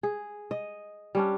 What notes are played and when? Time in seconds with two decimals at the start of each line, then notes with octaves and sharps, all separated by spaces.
0.03 G#4
0.51 D#5
1.15 G3 C#4 D4